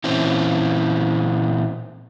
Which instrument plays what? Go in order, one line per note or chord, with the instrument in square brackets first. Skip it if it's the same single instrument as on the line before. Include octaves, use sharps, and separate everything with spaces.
[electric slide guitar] A#2 E3 C4 C#4 E4